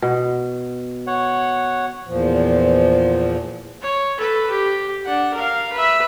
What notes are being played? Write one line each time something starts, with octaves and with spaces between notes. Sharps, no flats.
B2
C#5 F#5
E2 A#2 F3
C#5
A4 B4
G4
D4 F#5
A#4 F5
B4 E5